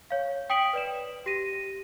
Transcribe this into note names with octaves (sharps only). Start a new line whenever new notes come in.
C#5 F5
G5 D#6 B6 D7 F#7
B4 D5 E7
G4 A#6 D#7